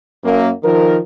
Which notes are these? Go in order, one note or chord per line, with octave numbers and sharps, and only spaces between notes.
F#2 A#3
D#3 F3 A#4